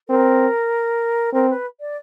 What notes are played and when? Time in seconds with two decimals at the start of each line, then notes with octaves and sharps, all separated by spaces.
0.09 C4 A#4
1.33 C4 A#4
1.50 B4
1.80 D5